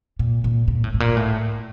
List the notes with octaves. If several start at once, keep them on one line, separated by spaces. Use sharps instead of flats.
A#2
A#2
A#2
A2
A2
A#2
A2